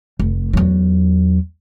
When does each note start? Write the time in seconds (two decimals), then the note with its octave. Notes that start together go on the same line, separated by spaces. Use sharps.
0.20 F1
0.53 E2 F#3